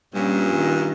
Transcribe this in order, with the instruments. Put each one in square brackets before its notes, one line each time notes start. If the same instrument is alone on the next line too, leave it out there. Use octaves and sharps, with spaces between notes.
[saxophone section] G2 A#2 [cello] G3 C#4
[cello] D#3